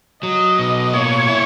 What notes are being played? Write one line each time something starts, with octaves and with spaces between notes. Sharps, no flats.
F#3 D#5
B2
A#3 C#5
E4